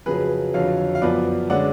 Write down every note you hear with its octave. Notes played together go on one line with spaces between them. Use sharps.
F2 C#3 F#3 G#4 B4
F2 D3 F#3 C#5 F5
F5
F#2 F3 B3 B4 D5
D3 G#3 C#4 D5 F#5